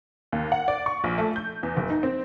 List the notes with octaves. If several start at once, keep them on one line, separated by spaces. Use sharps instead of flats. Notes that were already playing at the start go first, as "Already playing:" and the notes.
D#2
F#5
D5
C#6
A#1
A3
G6
E2
F#1
D#4
C4